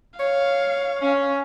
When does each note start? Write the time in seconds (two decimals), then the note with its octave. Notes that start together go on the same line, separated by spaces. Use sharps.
0.20 C#5 F5
1.02 C#4